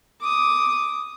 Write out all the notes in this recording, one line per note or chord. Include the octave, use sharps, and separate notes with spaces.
D6 D#6